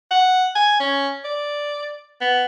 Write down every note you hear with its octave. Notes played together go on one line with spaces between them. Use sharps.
F#5
G#5
C#4
D5
B3